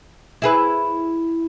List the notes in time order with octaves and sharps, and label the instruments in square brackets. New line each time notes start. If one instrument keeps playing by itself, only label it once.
[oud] E4 G#4 B4